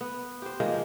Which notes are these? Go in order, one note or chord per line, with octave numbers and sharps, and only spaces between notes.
B3
G4 C5
D#3 F3 G#3 A#3